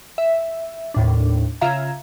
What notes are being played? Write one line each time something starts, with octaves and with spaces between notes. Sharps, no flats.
E5
D#2 A2 D4
C#3 F4 E5 F5 A#5 G#6